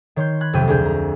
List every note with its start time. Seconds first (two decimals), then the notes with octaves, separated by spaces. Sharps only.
0.16 D#3 C#5 C6 G6
0.41 B5 F#6 G#6
0.53 B1 F2 C3 A3 G5 D#7
0.68 D2 G#4 G6
0.85 A#5